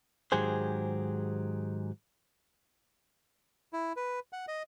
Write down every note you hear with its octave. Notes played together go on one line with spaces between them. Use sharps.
G#2 D#3 F#3 G4 G#4 C5
E4
B4
F#5
D#5